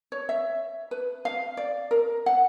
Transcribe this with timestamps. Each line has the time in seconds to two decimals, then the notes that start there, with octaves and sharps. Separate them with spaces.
0.12 C#5
0.29 E5
0.91 B4
1.25 F5
1.57 D5
1.91 A#4
2.26 F#5